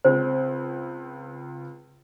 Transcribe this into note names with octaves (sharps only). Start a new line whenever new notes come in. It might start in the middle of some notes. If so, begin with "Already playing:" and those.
C#2 C4 C5